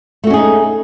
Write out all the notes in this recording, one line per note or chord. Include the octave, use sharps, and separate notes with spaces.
A3 C#4 D#4 F#4 G#4